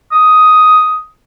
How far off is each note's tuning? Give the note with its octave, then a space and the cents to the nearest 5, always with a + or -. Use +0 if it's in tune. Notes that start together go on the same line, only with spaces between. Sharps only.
D#6 +5